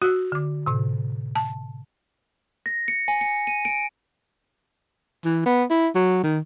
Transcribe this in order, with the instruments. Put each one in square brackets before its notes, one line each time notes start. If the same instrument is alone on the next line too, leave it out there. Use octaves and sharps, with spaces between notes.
[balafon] F#4 [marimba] E6 F#6
[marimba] D3 D6
A2 C3
[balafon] A5
[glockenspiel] A#6
C#7
G#5
C#7
D#7
D7
[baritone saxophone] E3
B3
E4
F#3
D#3